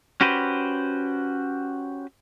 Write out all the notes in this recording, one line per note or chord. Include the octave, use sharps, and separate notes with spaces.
C#4 F#4 G4 B4 C5